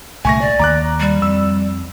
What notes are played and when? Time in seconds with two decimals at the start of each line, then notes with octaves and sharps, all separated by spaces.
0.25 C2 A#2 D3 A3 G#5 C#6 A#6
0.41 D5
0.59 D#2 A#5 D6 F#6
1.00 G3
1.22 F2 E6